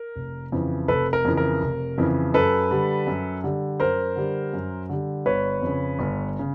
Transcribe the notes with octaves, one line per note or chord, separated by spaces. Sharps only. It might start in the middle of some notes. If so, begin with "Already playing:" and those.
Already playing: A#4
F1
F2 C#3 E3
F1 A4 B4
A#4
F2 C#3 E3
A#4
F1
F2 C#3 E3
F#2 A4 B4
D3 G3
F#2
D3 G3
F#2 A#4 C5
D3 G3
F#2
D3 G3
G1 B4 C#5
F2 C#3
G1
C#3